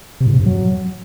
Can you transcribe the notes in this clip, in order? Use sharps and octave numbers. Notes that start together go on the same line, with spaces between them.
C3
A2
C3
F#2
F#3